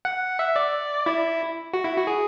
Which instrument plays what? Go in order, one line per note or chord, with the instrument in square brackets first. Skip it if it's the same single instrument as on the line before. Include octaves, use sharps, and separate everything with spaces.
[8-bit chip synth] F#5
E5
D5
E4
F#4
E4
F#4
G#4